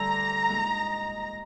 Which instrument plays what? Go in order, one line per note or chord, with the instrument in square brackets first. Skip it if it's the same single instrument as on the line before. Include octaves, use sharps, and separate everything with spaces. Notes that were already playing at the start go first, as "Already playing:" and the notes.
Already playing: [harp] D2 D3 G3 [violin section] A#5
[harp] A#2 G#3 D#4